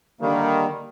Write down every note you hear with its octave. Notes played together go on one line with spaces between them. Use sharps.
D3 D#3 G3 A#3